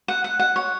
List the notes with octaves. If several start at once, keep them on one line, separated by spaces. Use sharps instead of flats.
F#5
F#5
F#5
C#5